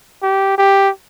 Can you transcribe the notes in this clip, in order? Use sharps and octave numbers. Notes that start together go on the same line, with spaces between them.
G4
G4